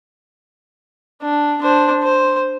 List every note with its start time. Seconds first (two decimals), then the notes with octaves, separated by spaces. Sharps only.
1.22 D4
1.61 D4 C5
2.03 C5